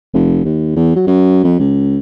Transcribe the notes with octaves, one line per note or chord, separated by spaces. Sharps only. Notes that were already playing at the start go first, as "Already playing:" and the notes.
F1
D#2
E2
F#3
F#2
F2
C#2